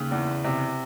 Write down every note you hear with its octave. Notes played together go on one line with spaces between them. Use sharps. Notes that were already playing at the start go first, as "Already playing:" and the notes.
Already playing: D#2 C#3
E2
C3